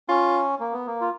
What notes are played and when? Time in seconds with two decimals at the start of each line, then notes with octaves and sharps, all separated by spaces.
0.08 C#4 F4
0.60 A#3
0.73 B3
0.87 A#3
1.01 F4